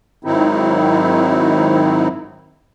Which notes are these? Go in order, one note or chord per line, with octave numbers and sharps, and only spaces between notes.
G#2 D#3 F#3 C4 D#4 E4